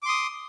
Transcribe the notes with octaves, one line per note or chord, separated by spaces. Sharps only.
C6 D6 D#6